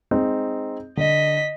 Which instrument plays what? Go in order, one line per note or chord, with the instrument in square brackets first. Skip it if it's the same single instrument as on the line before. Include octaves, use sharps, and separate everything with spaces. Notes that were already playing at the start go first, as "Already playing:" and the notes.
[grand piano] G#3 C4 D#4
[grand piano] D3 [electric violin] D#5 B6